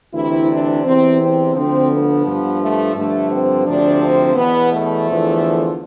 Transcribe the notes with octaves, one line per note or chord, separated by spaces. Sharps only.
D2 C3 E3 E4
D4
E2 C3 E3 C4
C4
D2 D3 F3 C4
B3
G2 F3
A3
G2 D3 F3 A3
C4
D2 C3 F3 D4
C4
E2 B2 B3
A3
E2 D3 F3